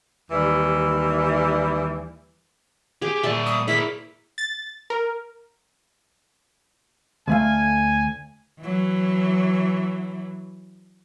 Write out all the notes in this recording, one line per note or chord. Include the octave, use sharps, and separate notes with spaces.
D#2 E3 G3
G4 G#4
A#2 A#3 D5 E5 A5 B5 C6
D#6
E4 G#4 A#4 B6
A6
A#4
D2 A3 F5 G#5
E3 F#3